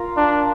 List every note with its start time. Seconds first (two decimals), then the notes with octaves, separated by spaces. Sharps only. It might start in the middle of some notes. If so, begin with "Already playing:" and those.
Already playing: F4 A#4
0.17 D4